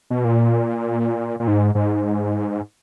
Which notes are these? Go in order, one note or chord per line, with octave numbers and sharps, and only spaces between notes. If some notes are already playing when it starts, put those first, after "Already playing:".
B2
A#2
A#2
G#2
G#2